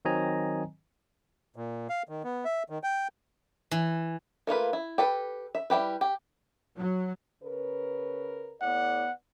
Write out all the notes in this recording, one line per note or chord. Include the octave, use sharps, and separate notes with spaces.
D#3 F#3 C4 D#5 G#5 A#5
A#2
F5
D#3
B3
E5
D#3
G5
E3
A3 A#3 F4 B4
E4
G4 A4 B4
E5
G3 E4 G4 B4
G4
F#3
C#3 A#4 B4
A2 B3 D5 F#5